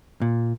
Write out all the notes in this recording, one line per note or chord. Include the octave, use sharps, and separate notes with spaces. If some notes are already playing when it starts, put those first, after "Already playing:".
A#2